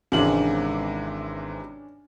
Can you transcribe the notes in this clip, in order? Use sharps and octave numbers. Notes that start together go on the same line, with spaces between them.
G#1 C3 E3 G#3 C#4 D4 F#7